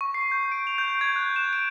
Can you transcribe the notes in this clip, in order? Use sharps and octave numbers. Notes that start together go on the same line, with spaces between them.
C#6
C7
G6
D7
F7
G6
G#6
F#6
E7
D7